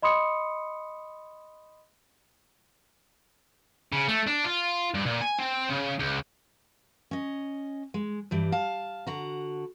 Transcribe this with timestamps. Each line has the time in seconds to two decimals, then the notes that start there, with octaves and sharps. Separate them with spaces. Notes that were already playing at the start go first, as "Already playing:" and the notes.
0.02 D#5 B5 C6 D#6 C#7
3.92 C#3
4.08 A3
4.27 D4
4.46 F4
4.94 G2
5.06 A#2
5.21 G#5
5.39 C4
5.69 C#3
5.99 C#2
7.11 C#4 D#5
7.94 G#3
8.31 G2 E3 G3
8.52 F5 A5
9.07 D3 F#4 A#5